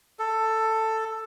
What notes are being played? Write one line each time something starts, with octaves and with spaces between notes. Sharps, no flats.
A4